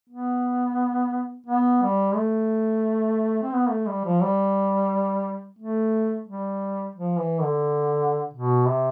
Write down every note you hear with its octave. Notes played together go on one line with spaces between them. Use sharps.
B3
B3
G3
A3
C4
B3
A3
G3
F3
G3
A3
G3
F3
E3
D3
B2
C3